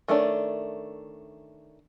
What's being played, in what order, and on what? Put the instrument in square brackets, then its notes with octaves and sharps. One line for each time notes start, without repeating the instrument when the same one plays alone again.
[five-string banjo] D#3 A3 C#4 D4